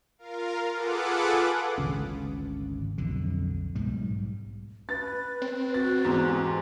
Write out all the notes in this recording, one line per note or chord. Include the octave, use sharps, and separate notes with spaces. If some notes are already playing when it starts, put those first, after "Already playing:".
F4 A#4 F5
F4 G#4 A4 B4 F#5 D6
G#1 D2 C#3 C#4
B1 F2 D3
B1 G#2 G3
B4 A6
C4
F#4 A6
E2 G#2 B3
G4